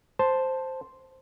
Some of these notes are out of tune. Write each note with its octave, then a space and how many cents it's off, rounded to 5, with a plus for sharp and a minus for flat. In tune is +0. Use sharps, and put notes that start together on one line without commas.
C5 +0 A5 +0